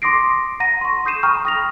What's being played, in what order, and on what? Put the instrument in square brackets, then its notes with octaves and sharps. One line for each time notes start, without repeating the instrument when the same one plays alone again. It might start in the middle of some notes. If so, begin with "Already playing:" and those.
[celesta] C6 D6 D#6 A#6 C7 D7
F#5 A#5 A#6 D#7
C6 C#6
D#6 G6 C7 D#7 E7
G5 A#5 B5 C#6 D#6 F6
D#6 A#6 F7